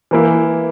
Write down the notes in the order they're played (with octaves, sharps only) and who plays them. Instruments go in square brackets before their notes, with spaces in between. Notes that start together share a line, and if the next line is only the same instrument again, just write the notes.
[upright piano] E3 A#3 E4